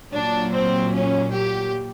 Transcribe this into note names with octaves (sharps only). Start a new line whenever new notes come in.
A#2 F#3 D4
C4
C#4
G4